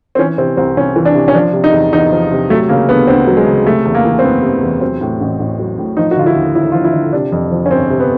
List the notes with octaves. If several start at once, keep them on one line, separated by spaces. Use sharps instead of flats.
C4
E3 C#4
C3 C4
C2 C4
C2 C#4
E3
D4
C3
C#4
F3 D4
C3
D#4
E2
E2 D#4
F3
C3
F#3 A3
C#3 A#3
D2 B3
D2 C4
F#3
G#3
C#3
C3 A3
E2
A#3
E3
C4
F#1 B3
C3
E2
F#3 C4
A2
A1
A1
F#3
A2
F3 D#4
F#4
D3 F4
E4
D#2
D#2 E4
F3 F4
E4
D3
C3 D4
F2
F3
C#4
G1 C4
C3
B3